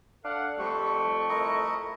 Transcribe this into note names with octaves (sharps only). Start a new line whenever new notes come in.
D4 A4 F5 F#5
F2 G3 A3 G4 C#6
E4 A#4 D#5